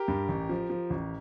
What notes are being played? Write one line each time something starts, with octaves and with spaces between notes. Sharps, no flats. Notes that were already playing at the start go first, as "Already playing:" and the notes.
Already playing: G4 A#4
G2
A1
F3
F3
A1